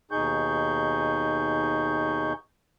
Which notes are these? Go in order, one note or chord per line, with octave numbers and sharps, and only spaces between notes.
D#2 B2 D#4 G#4 C#6 G6